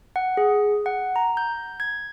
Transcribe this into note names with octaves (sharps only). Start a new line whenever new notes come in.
F#5
G#4
F#5
A#5
G6
G#6